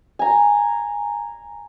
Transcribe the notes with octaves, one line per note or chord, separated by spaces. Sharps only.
G#5 A#5